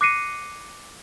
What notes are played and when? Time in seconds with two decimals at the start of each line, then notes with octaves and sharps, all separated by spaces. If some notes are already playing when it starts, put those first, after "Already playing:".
0.01 D6 F#6 A#6 C7 C#7 D#7